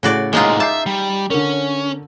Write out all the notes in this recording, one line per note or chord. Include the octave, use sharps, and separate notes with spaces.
A2 C#3 F#4 D5
G#2 G#3 A#3 D#4 F4
E5 A5 D6 G6 C7
G3
D3 C#4 A#4